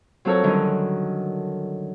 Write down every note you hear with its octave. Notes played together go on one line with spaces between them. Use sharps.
F#3 C4 F4 A4 A#4 C#5
D3 D#3 F#3 G3 C#4